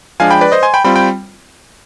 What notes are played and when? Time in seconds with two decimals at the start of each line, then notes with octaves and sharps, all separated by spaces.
0.20 F3 G#3 D4 F5 G#5
0.30 G5 B5
0.41 B4 D5
0.52 C5 D#5
0.63 G#5 C6
0.74 G5 B5
0.84 G3 C4 F4 G5 B5
0.96 G5 B5